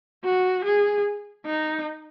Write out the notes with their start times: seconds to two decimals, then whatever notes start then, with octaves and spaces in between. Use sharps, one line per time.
0.24 F#4
0.65 G#4
1.46 D#4